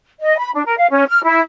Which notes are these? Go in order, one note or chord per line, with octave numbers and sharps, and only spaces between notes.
D#5
B5
D4
A#4
F5
C#4
F6
E4